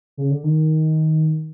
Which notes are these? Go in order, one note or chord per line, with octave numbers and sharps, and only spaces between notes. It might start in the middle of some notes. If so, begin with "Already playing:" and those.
C#3
D3
D#3